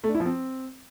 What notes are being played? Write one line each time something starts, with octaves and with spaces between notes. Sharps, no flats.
A3
D4
E4
F3
C4